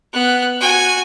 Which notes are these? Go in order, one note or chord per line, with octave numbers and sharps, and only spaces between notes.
B3 F#6
F#4 G#5